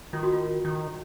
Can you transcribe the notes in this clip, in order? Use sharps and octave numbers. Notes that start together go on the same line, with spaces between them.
D#3 F4
F#4
F4
D#3